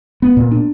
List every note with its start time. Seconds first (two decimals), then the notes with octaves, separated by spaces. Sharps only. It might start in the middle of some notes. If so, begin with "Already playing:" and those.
0.22 B3
0.37 A#2
0.51 D4